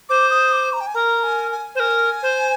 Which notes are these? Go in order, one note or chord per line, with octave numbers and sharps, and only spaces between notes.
C5 D6
D#6
D6
A#5
G5
G#5
A#4 A#5
G#5
G#5
C5
A#4 G#5
C5